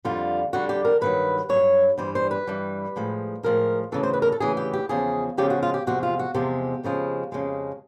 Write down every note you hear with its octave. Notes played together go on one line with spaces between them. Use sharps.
F2 D3 G3 F4
F2 D3 G3 F#4
G4
A#4
G2 D#3 F#3 B4
G2 D#3 F#3 C#5
G2 E3 G3 C5
C5
B4
G2 E3 G3
A2 F3 G#3
A2 F3 G#3 A#4
D2 C#3 E3 A4
C5
B4
A#4
A4
D2 C#3 E3 G#4
G4
G4
E2 C#3 F3 G#3 G#4
E2 C#3 F3 G#3 G4
F#4
F4
G4
E2 C3 F3 G#3 F#4
F4
F#4
E2 C3 F3 G#3 G4
F2 C#3 F3 G#3
F2 C#3 F3 G#3